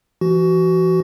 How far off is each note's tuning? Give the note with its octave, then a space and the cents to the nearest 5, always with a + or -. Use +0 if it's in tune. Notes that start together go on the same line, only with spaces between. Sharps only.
E3 +35 F#4 +20